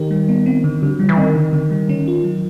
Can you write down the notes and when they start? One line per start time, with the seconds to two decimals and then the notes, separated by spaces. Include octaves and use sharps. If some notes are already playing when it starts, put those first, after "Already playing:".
Already playing: D#3 G4
0.11 G3
0.29 B3
0.46 C4
0.64 D3
0.82 D3 G3
0.91 F#3
0.99 F3 G3
1.09 E3
1.18 D#3 C4
1.35 D3
1.53 D3
1.71 G3
1.89 C#4
2.08 F4
2.24 F#3